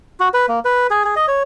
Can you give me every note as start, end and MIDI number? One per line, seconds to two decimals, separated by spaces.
0.20 0.28 66
0.34 0.46 71
0.48 0.59 58
0.65 0.87 71
0.90 1.03 68
1.05 1.15 68
1.16 1.26 75
1.28 1.43 73